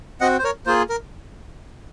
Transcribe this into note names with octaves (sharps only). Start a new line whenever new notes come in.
C4 F#4 D#5 F#5
C5
A#4 C#5
A#3 F4 G#4 C5
A#4